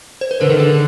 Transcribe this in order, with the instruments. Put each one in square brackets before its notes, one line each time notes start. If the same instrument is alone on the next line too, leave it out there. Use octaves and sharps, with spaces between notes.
[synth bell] C5
B4
[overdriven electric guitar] D3 [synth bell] A#4
[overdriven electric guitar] D#3 [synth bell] A4
[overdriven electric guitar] D3 [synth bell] G#4